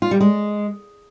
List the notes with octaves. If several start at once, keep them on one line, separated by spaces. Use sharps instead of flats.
F4
G3
G#3